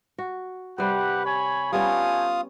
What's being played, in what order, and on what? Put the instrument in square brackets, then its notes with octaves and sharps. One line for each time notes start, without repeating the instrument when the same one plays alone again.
[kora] F#4
[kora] C3 G3 C5 [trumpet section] G4 B4 F#5
[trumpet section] C#5 G#5 B5
[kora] G3 B3 C#4 [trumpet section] A3 G#5 [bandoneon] F4 F5 D#6